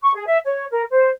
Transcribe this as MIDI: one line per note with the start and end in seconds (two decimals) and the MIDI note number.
0.02 0.11 85
0.14 0.25 68
0.26 0.38 76
0.44 0.65 73
0.71 0.83 70
0.90 1.10 72